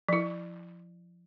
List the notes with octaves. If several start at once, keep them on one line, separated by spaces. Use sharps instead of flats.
F3 E4